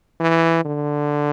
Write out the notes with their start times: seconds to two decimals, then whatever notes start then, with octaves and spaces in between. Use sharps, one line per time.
0.21 E3
0.65 D3